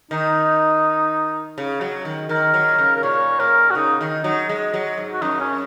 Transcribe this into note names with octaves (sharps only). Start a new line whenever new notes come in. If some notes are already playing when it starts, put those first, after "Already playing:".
D#3 D#4
C#3
F#3
D#3
D#3 A#4
F#3
A#2
C#3
A#4
A#2 C#5
A#2 A#4
F#4
C#3 D#4
D#3
F#3 D#4
G#3
F#3
G#2
F#4
F#2 D#4
C#4